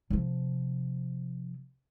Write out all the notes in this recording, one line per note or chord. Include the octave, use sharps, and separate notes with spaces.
C3 F3